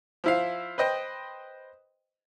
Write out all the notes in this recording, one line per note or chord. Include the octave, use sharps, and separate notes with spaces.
F3 E4 F5
B4 C5 D#5 G5